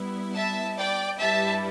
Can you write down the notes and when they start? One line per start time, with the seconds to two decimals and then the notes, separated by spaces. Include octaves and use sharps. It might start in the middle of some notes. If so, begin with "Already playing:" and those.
Already playing: G3 B3 E4
0.35 E5 A5
0.77 D5 G5
1.19 G2 G3 E4 B4 E5 A5